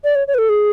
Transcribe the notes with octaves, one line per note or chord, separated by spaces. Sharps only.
D5
C#5
C#5
B4
A4
G#4